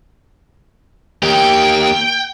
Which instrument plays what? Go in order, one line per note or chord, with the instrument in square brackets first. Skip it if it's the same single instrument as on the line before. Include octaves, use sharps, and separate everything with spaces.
[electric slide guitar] A#3 G4 [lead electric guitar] G5